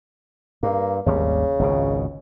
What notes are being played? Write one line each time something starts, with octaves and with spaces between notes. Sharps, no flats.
G2 A#3
G#1 D#2 C#3 G3
G#1 C#2 B2